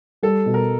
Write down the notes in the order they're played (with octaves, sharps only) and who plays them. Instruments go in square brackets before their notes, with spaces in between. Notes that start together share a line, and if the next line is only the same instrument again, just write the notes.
[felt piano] G3 [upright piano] A4
[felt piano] B2
[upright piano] A#4